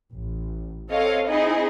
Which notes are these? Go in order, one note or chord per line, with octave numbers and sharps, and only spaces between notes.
A1
C4 A4 C#5 D#5 F5
C4 D#4 E4 G#4 D#5